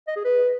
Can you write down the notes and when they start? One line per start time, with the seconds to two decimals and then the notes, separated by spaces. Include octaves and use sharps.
0.07 D#5
0.16 G#4
0.24 B4